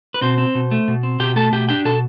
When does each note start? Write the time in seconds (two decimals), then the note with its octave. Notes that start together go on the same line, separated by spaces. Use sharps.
0.14 B4
0.21 B2 C4 C5
0.38 C4
0.55 B2
0.71 A3
0.88 B2
1.03 C4
1.20 B2 G4 G5
1.36 A3 A4 A5
1.52 B2 G4 G5
1.69 D4 G4 G5
1.85 B2 A4 A5